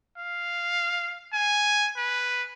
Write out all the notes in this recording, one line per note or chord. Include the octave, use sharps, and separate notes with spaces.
F5
G#5
B4